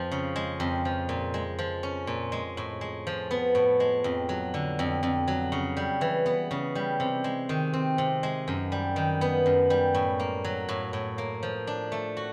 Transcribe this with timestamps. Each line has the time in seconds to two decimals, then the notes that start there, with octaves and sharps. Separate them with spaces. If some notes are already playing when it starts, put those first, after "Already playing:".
Already playing: F2 F3
0.11 C#3
0.36 G#3
0.60 F2
0.85 F3
1.09 A#2
1.34 G#3
1.59 F3
1.83 C#4
2.07 A#2
2.32 G#3
2.57 A2
2.81 G#3
3.07 F3
3.31 B3
3.55 A2
3.80 G#3
4.04 F2
4.29 F#3
4.54 D3
4.79 F2
5.03 F2
5.28 F#3
5.52 C#3
5.77 G3
6.01 E3
6.26 B3
6.51 C#3
6.75 G3
7.00 C3
7.24 G#3
7.49 D#3
7.74 C4
7.98 C3
8.23 G#3
8.48 F#2
8.72 G3
8.96 D#3
9.21 B3
9.46 F#2
9.70 G3
9.94 A2
10.20 A#3
10.44 F#3
10.69 A2
10.93 A2
11.18 A#3
11.43 F3
11.67 D4
11.92 A3
12.17 F#4